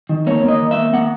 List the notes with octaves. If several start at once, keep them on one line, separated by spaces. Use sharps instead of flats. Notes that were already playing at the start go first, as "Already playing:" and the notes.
D#3
A#3 C#5
A#3 D#5
D#3
E5
A#3
A#3 F#5